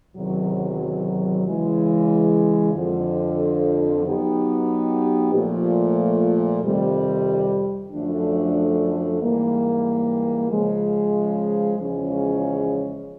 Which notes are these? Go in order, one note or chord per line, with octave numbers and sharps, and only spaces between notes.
E2 C3 D#3 F#3
C#3 E3 G#3
F2 D3 F3
F#3 B3 D#4 G4
A#2 F3 A3
F2 C3 D#3 G3
F#2 D3 F3 A3 D4
G#2 E3 G3 A#3
C#3 F3 G#3
E2 C#3 F3 G#3 C#4